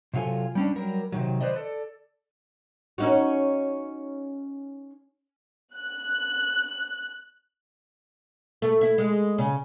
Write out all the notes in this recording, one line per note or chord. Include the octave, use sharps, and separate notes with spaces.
C3 F#3 F4 A4 G#5
G3 C#4 D4
F#3 G3 A#4
C3 D#3 F#3
B4 C5 D5 D#5
A4 D5
C#4 D#4 F#4
F#6
A3
E4
G#3
C#3